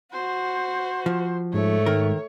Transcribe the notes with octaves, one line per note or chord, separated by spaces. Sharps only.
F#4 C5
F3
G#2 A3 C#5
D#3 A#4